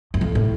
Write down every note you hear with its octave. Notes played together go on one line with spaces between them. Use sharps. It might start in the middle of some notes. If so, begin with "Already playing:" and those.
E2
F2
A2